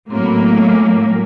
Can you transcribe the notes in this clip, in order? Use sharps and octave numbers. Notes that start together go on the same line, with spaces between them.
A2 F#3 A#3 C4
B3
A3
G#3
G3